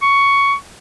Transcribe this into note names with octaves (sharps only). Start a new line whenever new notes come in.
C#6